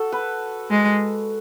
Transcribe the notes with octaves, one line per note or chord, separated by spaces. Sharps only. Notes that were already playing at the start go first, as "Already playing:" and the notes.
Already playing: F#4 A4
B4
G#3